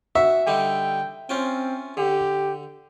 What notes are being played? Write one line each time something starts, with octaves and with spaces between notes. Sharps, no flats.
F#4 E5
D3 G3 D#4 G5
C4 C#4 F4 G5
D3 G4